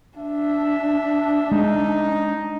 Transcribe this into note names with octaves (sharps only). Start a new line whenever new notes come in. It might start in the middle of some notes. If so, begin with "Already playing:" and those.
D4 E5
G#3 D#4